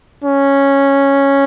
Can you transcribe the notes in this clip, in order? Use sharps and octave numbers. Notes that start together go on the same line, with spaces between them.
C#4